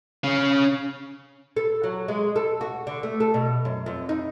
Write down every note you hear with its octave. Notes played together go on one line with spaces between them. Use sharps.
C#4 F5
A4
F#3
G#3
A4
F#4
D3
A3
A4
B2
F#2
F2
D#4